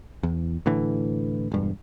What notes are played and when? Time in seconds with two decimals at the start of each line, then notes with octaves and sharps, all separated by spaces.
0.23 E2
0.66 A2 D3 E3
1.52 E1 G2